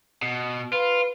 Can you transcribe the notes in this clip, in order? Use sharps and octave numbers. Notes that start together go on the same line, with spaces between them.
B2
F4 B4